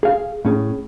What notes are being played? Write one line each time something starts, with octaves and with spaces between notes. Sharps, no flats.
G#4 F5
A2 C#4 G#4